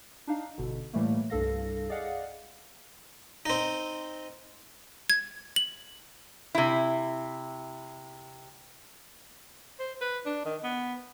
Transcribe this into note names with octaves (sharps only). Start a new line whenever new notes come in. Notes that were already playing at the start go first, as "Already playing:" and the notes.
D4 D#4 F5
G1 B2 D3
A2 E3 G3 A3 A#3
C2 G2 A4 F5 A#6
G#4 D5 D#5 F5 F#5
C4 D#4
G#6
F#7
C3 E4
C5
B4
D4
D#3
B3